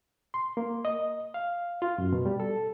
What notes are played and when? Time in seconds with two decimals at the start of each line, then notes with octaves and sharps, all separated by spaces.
0.34 C6
0.57 A#3
0.85 D#5
1.34 F5
1.82 F4
1.98 F#2
2.13 B2
2.26 G3
2.40 A4